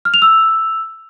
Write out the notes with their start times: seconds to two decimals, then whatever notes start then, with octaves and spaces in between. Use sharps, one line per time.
0.05 F6
0.14 F7
0.22 E6